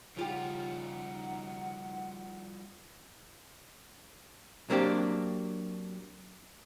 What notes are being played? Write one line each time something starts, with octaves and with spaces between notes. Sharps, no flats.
C#3 F3 G3 D#4 F4 G4 F#5
F#3 A#3 C4 D4 G4